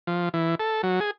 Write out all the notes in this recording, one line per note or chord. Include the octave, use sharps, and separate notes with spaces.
F3
E3
A4
F#3
G#4